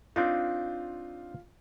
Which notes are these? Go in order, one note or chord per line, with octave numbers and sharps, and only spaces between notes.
C4 D4 D#4 F4